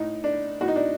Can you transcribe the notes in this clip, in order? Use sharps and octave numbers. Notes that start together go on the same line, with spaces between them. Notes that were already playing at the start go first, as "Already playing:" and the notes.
Already playing: A2 D#4
D4
A2 F#4
D#4
D4